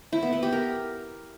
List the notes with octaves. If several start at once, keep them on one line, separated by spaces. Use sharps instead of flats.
E4
B3
B3
G4
A#4